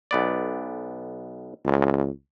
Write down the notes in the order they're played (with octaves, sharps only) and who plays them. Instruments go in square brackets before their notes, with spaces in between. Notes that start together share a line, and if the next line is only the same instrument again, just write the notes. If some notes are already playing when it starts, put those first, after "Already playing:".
[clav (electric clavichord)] B1 B3 D5
[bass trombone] C#2